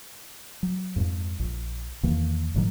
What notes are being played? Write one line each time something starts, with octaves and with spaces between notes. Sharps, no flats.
F#3
F2 G#2
A#1
E2 D#3 E3 A#3
G1 A2 D#3 F#3